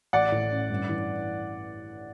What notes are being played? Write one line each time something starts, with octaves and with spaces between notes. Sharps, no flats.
A1 D5 F#5
A2
C#4
G2
E3